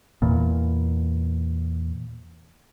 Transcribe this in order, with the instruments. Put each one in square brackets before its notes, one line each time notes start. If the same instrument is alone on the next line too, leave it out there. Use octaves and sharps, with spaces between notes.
[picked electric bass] E2 A#2